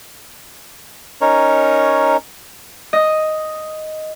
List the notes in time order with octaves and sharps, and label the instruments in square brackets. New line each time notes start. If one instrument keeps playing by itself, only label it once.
[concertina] C#4 D#4 A#4 C#5
[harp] D#5